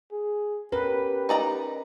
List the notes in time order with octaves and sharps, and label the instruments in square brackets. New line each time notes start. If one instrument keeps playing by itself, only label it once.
[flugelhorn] G#4
[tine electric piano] C#4 A#4 [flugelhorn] G4 [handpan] B4
[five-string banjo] D#4 D5 A#5